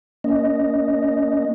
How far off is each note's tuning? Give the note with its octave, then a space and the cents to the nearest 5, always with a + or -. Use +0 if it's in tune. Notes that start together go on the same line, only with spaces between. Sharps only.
A#3 +10 C#4 +35 D#5 +0